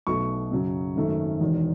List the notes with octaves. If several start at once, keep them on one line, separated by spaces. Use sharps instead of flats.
B1 B2 A3 C#6
F#2 C#3 F#3
G#1 F#2 D#3 A3
E1 E2 D#3